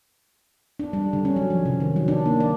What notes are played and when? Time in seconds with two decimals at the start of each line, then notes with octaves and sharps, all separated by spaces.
0.79 D4
0.93 G3
1.13 D3
1.25 C#4
1.36 F#3
1.50 F3
1.65 C3
1.80 D#3
1.96 F#3
2.08 D4
2.26 A#3
2.40 D5